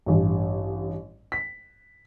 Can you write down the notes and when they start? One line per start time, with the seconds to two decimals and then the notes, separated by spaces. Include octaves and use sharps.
0.06 A1 G2
1.32 B6